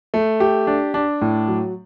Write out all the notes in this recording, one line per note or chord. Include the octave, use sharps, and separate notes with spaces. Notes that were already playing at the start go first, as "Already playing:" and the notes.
A3
G4
D4
D4
A2
F#3